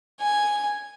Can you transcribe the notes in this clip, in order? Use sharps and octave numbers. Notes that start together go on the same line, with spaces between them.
G#5